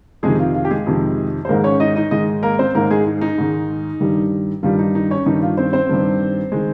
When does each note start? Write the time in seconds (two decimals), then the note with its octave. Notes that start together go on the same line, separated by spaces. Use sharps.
0.23 F2 C3 D#3 G#3 G#4
0.39 F4
0.54 F4
0.65 G4
0.71 G#3 G#4
0.87 F2 C3 D#3
1.45 C5
1.49 G#2 D#3 G#3 A#3 A#4
1.64 C#4 C#5
1.80 D#4 D#5
1.96 D#4 D#5
2.11 G#2 D#3 G#3 D#4 D#5
2.43 A#3 A#4
2.59 C4 C5
2.74 G#2 D#3 G#3 A#3 A#4
2.91 G#3 G#4
3.07 D#4
3.21 D#4
3.38 G#2 D#3 G#3
4.00 G2 D#3 G3
4.63 G2 D#3 G3 F4
4.79 D#4
4.95 D#4
5.11 C#4 C#5
5.26 G2 D#3 G3 D#4
5.42 F4
5.57 C4 C5
5.73 C4 C5
5.89 G2 D#3 G3
6.52 D#3 G#3